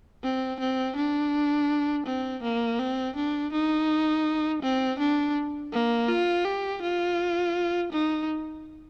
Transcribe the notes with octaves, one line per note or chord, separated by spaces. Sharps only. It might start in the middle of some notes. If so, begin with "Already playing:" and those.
C4
C4
D4
C4
A#3
C4
D4
D#4
C4
D4
A#3
F4
G4
F4
D#4